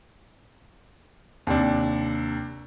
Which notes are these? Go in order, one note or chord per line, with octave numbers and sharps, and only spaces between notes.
D#2 C3 D4